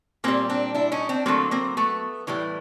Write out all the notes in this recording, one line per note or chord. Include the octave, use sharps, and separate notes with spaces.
A#2 G3 A#3 C4
C4 D4
D4 E4
C#4 D#4
C4 D4
D3 F#3 A3 A#3 C4
A#3 C4
A3 B3
A2 E3 G3